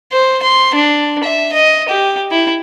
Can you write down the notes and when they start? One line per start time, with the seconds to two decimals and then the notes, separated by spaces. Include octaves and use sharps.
0.12 C5
0.43 C6
0.75 D4
1.24 E5
1.53 D#5
1.89 G4
2.31 E4